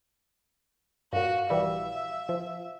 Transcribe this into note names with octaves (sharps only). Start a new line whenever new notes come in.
G2 A#2 F#4 F5
A#1 E3 G3 E5
F3